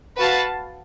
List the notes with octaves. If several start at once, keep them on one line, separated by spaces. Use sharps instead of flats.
F#4 B4 F5 A5